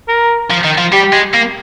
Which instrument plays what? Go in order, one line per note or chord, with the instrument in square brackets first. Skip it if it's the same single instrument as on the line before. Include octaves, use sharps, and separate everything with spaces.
[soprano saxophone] A#4
[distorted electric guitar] F3
D#3
F3
[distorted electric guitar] G3 [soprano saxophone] G4
[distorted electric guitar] G#3
A#3